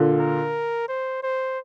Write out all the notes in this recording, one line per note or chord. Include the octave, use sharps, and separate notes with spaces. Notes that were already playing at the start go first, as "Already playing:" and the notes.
Already playing: A#2 D3
A#4
C5
C5